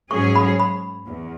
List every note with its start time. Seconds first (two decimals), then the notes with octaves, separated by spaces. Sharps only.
0.11 G#2 F#3 C#4 G#4 C#6
0.35 B5
0.60 B5
1.07 E2